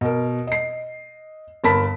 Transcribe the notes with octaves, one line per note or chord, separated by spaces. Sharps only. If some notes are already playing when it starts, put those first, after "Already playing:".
B2 A#4
D#5 C7
G1 A#4 A5 B5 B6